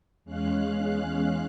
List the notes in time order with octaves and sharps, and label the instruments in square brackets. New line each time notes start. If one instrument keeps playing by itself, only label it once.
[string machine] E2 G#3 C#4 F5 F#6